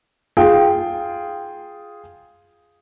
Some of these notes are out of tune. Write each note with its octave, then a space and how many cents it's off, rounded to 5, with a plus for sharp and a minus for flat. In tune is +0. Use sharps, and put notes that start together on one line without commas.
F4 +0 G#4 +0 G5 +0